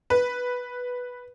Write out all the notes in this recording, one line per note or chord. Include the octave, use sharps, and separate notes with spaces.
B4